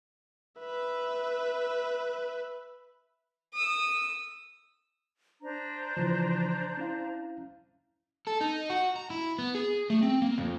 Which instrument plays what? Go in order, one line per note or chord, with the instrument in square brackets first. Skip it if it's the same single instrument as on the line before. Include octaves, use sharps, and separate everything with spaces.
[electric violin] B4 E5
[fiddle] D#6 E6
[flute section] D4 C5 A#5
[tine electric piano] C#3 E3 F3
C#4 E4 F5
[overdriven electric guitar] A4
D#4
F#4
A#5
E4
B3
G#4
A3
C4
A#3
F2